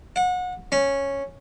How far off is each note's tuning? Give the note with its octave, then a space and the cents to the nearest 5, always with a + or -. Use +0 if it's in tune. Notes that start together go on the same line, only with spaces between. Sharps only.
F#5 -30
C#4 -5